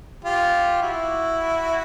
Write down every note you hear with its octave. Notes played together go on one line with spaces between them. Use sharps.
F4 G4
E4 F#4